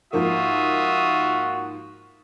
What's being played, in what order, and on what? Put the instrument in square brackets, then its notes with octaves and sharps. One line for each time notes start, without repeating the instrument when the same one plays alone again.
[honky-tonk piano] G#2 F3 A#3 [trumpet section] F4 E5 D#6 [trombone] F#4